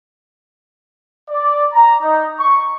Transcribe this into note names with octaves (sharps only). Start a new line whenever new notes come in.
D5
A#5
D#4
C#6